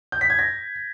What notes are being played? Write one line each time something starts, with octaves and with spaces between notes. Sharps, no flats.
G6
B6
G#6
A#6